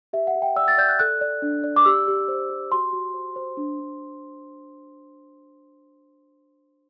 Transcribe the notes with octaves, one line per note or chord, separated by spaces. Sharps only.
G4 E5
F#5
G4
G5
D5 E6
A6
D5 G6
F#6
A4 F#6
D5
D4
D5
D6
G4 E6
G4
C5
G4
F#4 C6
F#4
C5
C5
D4
D4